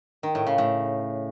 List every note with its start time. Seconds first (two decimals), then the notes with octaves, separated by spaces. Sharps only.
0.23 D#3
0.35 A2
0.47 C#3
0.58 A2